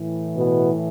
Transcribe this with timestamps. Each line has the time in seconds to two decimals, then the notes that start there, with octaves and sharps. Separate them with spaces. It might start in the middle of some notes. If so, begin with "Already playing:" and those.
Already playing: A2 E3
0.37 B2 B3